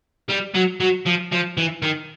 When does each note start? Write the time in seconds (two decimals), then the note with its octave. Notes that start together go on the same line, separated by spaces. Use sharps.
0.29 G3
0.54 F#3
0.80 F#3
1.06 F3
1.32 F3
1.57 E3
1.82 D#3